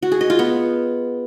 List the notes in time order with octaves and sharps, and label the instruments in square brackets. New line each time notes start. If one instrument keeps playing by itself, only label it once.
[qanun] F#4
G#4
D#5
F4
B3